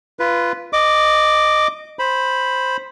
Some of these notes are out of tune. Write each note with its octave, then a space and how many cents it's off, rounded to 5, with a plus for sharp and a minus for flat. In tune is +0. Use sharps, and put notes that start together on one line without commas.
F4 -20 B4 +0
D#5 -15 D6 +0
C5 +5 B5 +0